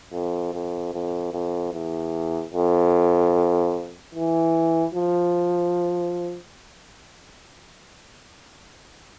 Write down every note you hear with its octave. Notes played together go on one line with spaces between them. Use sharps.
F2
F2
F2
F2
E2
F2
E3
F3